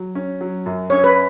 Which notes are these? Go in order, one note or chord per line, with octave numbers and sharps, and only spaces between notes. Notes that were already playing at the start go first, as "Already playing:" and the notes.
Already playing: F#3
C#4
F#3
F#2
C#4 C#5
B4